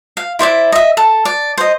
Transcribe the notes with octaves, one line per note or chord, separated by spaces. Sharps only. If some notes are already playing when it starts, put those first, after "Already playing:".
F5
E4 C5 D5 E5
D#5 E5
A4
D5
C5 D#5